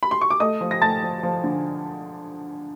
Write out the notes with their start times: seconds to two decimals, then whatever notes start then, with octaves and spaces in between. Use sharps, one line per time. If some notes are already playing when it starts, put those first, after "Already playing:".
0.03 B5
0.11 C6
0.21 C#6
0.30 D6
0.40 A3 D#5 D#6
0.61 F3
0.71 A#6
0.81 A3 A5 A6
1.03 F3
1.23 F3
1.44 D3